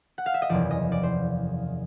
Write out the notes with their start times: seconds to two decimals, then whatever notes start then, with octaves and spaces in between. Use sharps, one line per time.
0.18 F#5
0.26 F5
0.34 E5
0.42 D#5
0.49 F#1 E2 C3 F3 D5
0.71 D#5
0.92 D5
1.03 C5